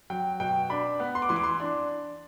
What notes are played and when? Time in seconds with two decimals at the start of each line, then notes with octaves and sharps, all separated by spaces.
0.10 F#3 G5
0.40 B2 G5
0.70 D4 B5
1.00 B3
1.15 C6
1.22 D6
1.29 E3 C6
1.36 D6
1.43 C6
1.60 D4